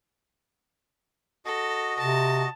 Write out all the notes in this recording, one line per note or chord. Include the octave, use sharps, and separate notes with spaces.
F#4 A4 D#5
C3 A5